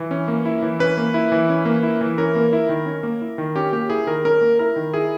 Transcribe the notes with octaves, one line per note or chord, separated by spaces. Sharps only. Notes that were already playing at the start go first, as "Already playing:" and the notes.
Already playing: E3
C#4
A#3
E4
E3
C#4 B4
A#3
E4
E3
C#4
A#3
E4
E3
C#4 A#4
A#3
E4
D#3
C#4
A#3
E4
D#3
C#4 G4
A#3 G4
E4 G#4
D#3 A#4
C#4 A#4
A#3
E4 A#4
D#3
E4 G#4